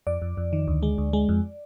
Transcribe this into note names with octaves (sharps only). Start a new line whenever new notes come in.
F2 D5
F2
F2
D#3
D2
G#3
D2
G#3
F2